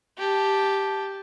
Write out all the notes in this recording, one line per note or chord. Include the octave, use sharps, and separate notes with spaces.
G4 A5